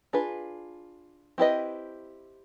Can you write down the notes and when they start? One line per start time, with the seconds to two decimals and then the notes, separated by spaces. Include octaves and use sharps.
0.13 D4 F4 G#4 B4
1.38 C4 E4 G4 B4 D#5